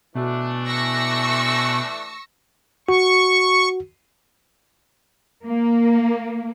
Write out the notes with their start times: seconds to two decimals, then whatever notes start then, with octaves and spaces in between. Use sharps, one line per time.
0.15 B2 E3 A3 D4
0.67 C#6 E6 A#6
2.89 F#4 C#6
5.45 A#3